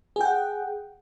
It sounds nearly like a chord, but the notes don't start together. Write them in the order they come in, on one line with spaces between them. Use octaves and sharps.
G#4 G5 F#5